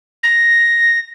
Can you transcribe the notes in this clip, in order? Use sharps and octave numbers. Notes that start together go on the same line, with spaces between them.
A#6